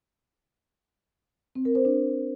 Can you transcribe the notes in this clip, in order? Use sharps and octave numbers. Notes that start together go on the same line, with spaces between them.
C4
A#4
C5
D4